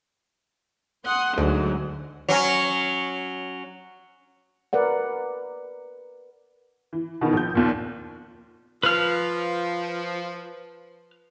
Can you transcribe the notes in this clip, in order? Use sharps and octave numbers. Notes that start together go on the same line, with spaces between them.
F#5 C6 D#6
D2 G#2 D3 F#3
F#3 C#4
A#4 B4 D5 F#5
E3
B2 D#3 E3 B3
A#1 G6
D#2 A#2
F3 B4 F6